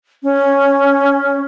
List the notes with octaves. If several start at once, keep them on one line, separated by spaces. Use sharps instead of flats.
C#4